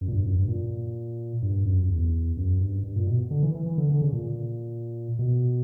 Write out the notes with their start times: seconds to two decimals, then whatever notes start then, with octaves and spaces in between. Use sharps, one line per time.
0.01 F#2
0.08 A#2
0.13 G2
0.25 F#2
0.36 G2
0.48 A#2
1.42 G2
1.65 F#2
1.84 F#2
1.90 E2
2.37 F#2
2.61 G2
2.83 G2
2.96 A#2
3.07 B2
3.31 D3
3.43 E3
3.55 E3
3.66 E3
3.78 D3
3.90 D3
4.02 C#3
4.13 A#2
5.19 B2